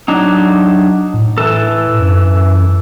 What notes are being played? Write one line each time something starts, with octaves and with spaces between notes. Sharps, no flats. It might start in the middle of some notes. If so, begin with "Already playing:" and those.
F#3 D4 D#4
A2
E3 A4
F#2